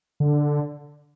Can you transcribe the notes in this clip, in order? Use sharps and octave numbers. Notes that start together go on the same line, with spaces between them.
D3